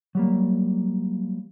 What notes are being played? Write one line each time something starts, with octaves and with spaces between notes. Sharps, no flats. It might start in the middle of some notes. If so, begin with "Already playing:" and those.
F#3 G3 A#3